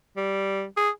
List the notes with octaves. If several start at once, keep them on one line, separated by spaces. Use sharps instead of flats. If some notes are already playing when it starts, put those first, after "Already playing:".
G3
G#4